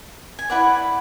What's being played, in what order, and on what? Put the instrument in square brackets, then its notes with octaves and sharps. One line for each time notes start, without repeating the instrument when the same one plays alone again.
[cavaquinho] G#5
E4 B4 D5 F#5